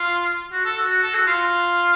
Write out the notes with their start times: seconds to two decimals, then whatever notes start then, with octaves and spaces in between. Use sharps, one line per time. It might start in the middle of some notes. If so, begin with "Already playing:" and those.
Already playing: F4
0.53 F#4
0.65 A4
0.77 F#4
0.89 F#4
1.02 A4
1.14 F#4
1.27 F4